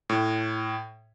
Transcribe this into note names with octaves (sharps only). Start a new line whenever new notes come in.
A2